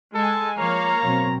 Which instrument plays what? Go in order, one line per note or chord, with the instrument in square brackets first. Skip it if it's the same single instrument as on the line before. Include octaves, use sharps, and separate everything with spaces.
[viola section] G#3 G#5 [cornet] A4
[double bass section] F3 [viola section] A#3 C#5 F5 [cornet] A#5
[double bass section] B2 F#3 C4